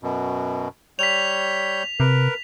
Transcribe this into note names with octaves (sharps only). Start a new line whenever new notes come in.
F#2 B2
G3 C#5 G6 B6 F7
C3 A#4 B4